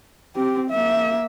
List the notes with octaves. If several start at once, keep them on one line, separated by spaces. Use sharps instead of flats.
C4 G4
A#3 E5